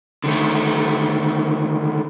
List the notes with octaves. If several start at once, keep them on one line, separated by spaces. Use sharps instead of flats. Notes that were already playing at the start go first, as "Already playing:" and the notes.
D3 D#3 A3